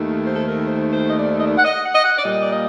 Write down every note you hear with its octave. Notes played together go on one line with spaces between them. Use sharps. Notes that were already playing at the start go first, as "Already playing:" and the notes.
Already playing: D#2 D#3 A3
C5
A4
A#4
C5
C5
D#5
D5
D#5
D5
F#5
D#5
F#5
D#5
F#5
D5
A#2 G3 A#3 D#5
D5
D#5